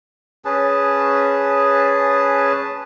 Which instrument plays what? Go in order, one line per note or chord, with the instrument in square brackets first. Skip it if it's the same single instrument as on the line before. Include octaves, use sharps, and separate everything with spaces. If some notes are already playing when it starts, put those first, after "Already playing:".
[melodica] C#4 G#4 B4 A5